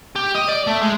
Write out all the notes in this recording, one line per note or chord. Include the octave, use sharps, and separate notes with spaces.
G4
D#5
D5
A3
G#3